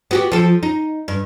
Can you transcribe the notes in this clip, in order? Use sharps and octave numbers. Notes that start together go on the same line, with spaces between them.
B3 F#4 G4
F3 A4
D#4
G2